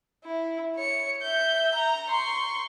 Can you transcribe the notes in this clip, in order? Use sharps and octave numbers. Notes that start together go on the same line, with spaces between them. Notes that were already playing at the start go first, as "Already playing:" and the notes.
E4
C#5 C#7
E5 G6
A#5
C6 C#6